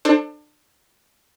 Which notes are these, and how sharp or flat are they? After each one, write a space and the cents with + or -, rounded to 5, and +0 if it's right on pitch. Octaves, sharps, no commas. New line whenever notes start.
D4 +30 A4 +15 C5 +25